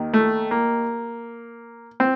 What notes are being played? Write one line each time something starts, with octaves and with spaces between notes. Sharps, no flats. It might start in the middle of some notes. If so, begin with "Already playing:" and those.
Already playing: D#2 D#3
A3
A#3
C4